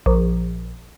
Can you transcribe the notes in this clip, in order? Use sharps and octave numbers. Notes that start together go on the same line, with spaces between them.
A#1